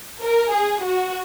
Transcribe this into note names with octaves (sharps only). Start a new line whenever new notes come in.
A#4
G#4
F#4